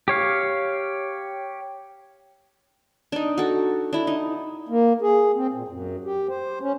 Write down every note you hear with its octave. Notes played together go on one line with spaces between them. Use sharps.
G4 C#5 F5
D4 D#4
F#4 A4
D4 E4
D#4
A#3
G#4
C4
A#2
F#2
G4
C5
C#4